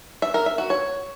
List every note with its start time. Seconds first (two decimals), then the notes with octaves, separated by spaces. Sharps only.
0.22 E5
0.34 A#4
0.46 E5
0.58 F#4
0.70 C#5